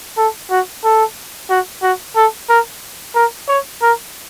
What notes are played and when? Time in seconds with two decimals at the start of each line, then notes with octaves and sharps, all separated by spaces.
0.17 A4
0.51 F#4
0.84 A4
1.50 F#4
1.83 F#4
2.16 A4
2.49 A#4
3.15 A#4
3.48 C#5
3.82 A#4